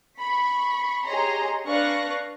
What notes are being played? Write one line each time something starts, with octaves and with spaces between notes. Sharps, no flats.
B5 C#6
G4 G#4 C#5 D#5 A#5 C6
D4 B4 F5 C#6 F#6 A#6